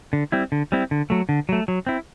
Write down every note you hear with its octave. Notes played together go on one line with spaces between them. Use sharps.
D3
G3 C4 E4
D3
G3 C4 E4
D3
F#3 A3
D3
F#3 A3
F#3
C4 E4